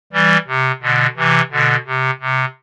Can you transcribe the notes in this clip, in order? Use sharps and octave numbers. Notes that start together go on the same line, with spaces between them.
E3 G3
C3
B2 D3
C3 E3
B2 D3
C3
C3